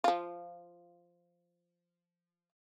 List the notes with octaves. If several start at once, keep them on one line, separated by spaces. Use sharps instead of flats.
F3 F4